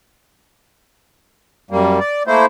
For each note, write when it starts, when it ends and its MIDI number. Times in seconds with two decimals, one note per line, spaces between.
1.71 1.99 42
1.71 1.99 55
1.71 1.99 58
2.00 2.23 74
2.27 2.46 57
2.27 2.46 58
2.27 2.46 64
2.27 2.46 72